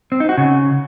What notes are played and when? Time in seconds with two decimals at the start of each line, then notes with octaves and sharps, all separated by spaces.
0.12 C4
0.20 D#4
0.29 F#4
0.38 C#3